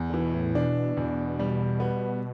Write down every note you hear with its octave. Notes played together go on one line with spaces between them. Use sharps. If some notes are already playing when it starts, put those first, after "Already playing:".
Already playing: E2
D3 E3
B2
A2
B2 D4
E2 B2
G3
B3